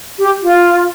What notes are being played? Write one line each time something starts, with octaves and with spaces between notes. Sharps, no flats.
G4
F4